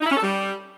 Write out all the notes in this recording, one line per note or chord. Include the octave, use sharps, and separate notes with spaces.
D#4
E4
C#4
A4
G3